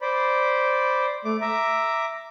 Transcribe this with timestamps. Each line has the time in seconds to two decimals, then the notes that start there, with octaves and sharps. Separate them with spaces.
0.01 C5 D5 B5
1.25 A3 D6
1.41 E5 A#5 D6